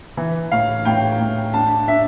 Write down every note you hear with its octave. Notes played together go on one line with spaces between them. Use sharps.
E3
A2 F5
A2 G5
A2
D4 A5
D4 E5